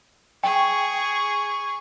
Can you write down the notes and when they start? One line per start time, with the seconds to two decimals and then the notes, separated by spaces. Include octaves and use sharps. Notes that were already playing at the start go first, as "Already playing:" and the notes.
0.44 G#4 G5 C#6